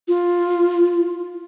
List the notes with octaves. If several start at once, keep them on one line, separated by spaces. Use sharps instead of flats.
F4